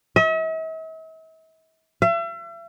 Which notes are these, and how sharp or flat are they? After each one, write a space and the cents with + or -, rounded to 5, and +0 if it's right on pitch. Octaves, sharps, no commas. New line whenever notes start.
E5 -45
E5 +40